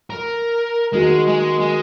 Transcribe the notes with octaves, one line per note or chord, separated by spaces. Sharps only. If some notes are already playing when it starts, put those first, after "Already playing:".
A#4
D#3 G#3 A#3 F#4 A#4
G#3
G#3